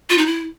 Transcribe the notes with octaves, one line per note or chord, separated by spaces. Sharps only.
F4
D#4
E4